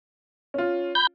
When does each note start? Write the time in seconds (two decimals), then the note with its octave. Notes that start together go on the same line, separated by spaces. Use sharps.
0.54 C#4 F4
0.95 B5 G6